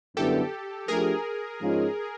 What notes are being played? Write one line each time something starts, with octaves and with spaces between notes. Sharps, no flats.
F#2 D3 G3 B3 E4 G4 A4
F3 A3 D4 G4 G#4 A#4
G#2 F3 G#3 C#4 F4